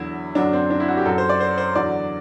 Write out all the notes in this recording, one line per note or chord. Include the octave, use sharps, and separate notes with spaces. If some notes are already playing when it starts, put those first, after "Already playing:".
Already playing: E2 D3 F#3 E4
F#2 D3 F#3 D4
C4
D4
E4
F#4
G4
F#2 F#3 A4
C5
D5
C5
C5
E2 D3 F#3 D5